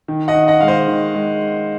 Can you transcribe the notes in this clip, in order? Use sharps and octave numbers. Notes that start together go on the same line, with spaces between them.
D#3
D#5 F#5
D#3
D#5 F#5
G#3 F5
C5 D#5
D#3
G#3